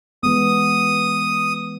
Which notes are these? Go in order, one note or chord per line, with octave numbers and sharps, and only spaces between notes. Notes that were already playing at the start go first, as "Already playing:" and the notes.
E3 G#3 B3 D#6